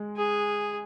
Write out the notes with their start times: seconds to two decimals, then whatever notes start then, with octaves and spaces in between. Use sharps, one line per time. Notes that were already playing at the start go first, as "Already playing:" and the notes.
Already playing: G#3
0.17 G#4